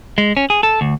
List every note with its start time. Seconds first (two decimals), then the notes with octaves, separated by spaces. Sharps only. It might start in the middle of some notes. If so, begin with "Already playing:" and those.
0.18 G#3
0.37 C#4
0.50 G#4
0.63 A4
0.81 D2